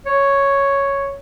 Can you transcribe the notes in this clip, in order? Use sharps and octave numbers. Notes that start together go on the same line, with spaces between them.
C#5